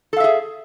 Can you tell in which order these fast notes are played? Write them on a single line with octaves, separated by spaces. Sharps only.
A4 F5 E5 G#4